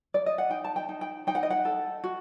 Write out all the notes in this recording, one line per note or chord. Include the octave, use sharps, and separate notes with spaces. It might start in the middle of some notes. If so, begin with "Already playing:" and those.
D5
D#5
F#5
D#4 G5
A5
G5
D#4
G5
D#4 G5
F#5
D#5
F#5
A4
F#4